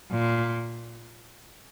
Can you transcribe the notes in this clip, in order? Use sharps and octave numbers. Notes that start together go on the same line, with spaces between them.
A#2